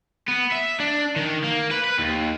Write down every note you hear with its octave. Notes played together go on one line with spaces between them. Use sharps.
B3
E5
D4
D#3
A#3
B4
B4
D#2